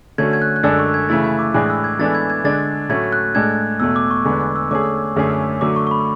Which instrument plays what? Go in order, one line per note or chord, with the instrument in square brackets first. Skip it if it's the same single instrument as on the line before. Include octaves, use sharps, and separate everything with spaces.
[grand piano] D3 A3 C#4 F#4 [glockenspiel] G#6
[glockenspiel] G#6
F#6
F#6
[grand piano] F#2 D3 G#3 D4 A4 [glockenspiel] E6
[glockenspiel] C#6
G#6
[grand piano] C#3 E3 A3 E4 [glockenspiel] A6
[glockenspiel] G#6
D6
[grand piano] A2 E3 G#3 D4 G#4 [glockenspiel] F#6
[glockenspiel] E6
G#6
[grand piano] E3 G#3 B3 D4 A4 [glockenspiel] A6
[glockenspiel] G#6
G#6
[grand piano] D3 G#3 D4 [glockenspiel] A6
[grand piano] A2 F#3 A3 C#4 F#4 [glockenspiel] G#6
[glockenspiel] F#6
[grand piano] A2 G#3 D4 A4 [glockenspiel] G#6
[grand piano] E2 B2 A3 [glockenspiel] E6
[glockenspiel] D6
C#6
[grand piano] E2 D3 G#3 B3 [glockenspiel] C#6
[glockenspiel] D6
E6
[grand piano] D3 A3 C#4 G#4 [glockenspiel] D6
[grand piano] F#2 D3 A3 C#4 G#4
[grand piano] D3 F#3 A3 [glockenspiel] D6
[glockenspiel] C#6
C#6
B5